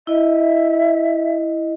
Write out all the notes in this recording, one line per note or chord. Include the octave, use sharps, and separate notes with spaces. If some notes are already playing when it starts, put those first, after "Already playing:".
E4 D#5 E5